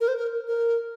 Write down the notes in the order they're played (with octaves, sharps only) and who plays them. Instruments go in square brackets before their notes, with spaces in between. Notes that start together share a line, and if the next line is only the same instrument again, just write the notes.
[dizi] A#4
C5
A#4
A#4